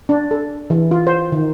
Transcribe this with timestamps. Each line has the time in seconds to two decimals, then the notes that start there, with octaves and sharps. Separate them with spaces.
0.09 D4
0.31 A4
0.70 E3
0.91 F4
1.07 C5
1.32 D#3